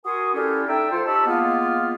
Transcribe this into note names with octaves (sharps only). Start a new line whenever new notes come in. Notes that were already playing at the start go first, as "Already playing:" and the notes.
F#4 A#4 G#5 C6 C#6 D#6
G3 C#4 E4 F4 G4 A4
A3 D#4 D5 E5 G5
F3 F4 A4 C5
D#4 G4 A5 B5 C#6 E6
G#3 A#3 B3 F4